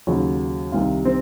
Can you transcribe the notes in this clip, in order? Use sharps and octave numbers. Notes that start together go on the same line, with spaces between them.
D#2 C#3 F#3
C2 C3 D#3 F4
C4